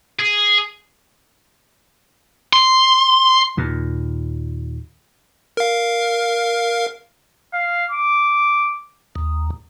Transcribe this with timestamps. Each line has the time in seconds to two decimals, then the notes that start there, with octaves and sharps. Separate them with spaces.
0.19 G#4
2.53 C6
3.57 D#2 A#2
5.57 A#4 F5
7.53 F5
7.91 D6
9.16 D#2